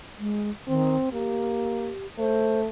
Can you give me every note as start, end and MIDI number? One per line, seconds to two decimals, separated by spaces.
0.19 0.50 56
0.68 0.96 51
0.68 1.09 60
1.12 1.91 58
1.12 2.06 67
2.19 2.69 57
2.19 2.60 72